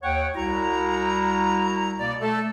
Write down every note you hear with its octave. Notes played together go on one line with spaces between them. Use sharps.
D#2 C#5 F#5 G5
C2 E4 F#4 A#5
B2 A#3 D5
A3 A4